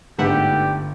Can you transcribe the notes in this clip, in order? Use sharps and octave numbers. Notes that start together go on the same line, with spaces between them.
G1 G#2 A3 D4 G4 B4 E5 F#5